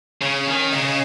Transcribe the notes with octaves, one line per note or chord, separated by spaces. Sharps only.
C#3 C#4
D#3
C#3 D#5
C#3